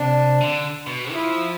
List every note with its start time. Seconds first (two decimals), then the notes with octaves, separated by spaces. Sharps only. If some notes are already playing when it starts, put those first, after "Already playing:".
Already playing: C3 D4
0.41 D3
0.87 B2
1.11 F3 E4